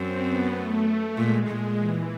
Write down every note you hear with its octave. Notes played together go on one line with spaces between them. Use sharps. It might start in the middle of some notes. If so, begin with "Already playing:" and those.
Already playing: F#2 C4
B3
A3
A#2 G#3
A#2
E3